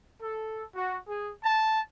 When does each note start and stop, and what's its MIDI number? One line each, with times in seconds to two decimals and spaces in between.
0.23 0.65 69
0.75 0.97 66
1.09 1.32 68
1.43 1.81 81